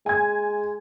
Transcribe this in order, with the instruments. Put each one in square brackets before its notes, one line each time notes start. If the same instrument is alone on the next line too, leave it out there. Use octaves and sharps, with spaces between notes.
[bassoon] G#3 [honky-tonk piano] G#5 G#6